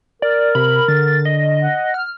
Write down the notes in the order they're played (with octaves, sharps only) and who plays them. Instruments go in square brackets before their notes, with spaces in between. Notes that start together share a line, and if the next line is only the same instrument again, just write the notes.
[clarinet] A#4 [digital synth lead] D5
[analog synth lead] C3 [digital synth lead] B5
[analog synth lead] D3 [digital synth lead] A6
[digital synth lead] D#5
[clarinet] F#5
[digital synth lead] F6